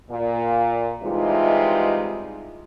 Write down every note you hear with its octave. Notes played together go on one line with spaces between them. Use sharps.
A#2
C3 E3 G3 G#3 D#4 F4